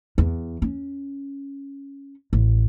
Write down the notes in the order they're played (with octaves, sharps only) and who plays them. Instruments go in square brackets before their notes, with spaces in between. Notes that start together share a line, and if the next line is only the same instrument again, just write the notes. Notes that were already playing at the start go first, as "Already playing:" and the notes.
[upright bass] E2
C#4
A1